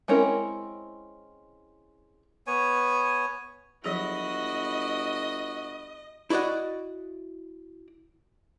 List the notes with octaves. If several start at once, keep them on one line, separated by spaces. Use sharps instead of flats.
G#3 C4 C#4 E4 A#4
B3 C#5 G#5
G1 F3 F#3 E4 F#4 G#4 D#5
E4 F#4 D5 D#5 F#5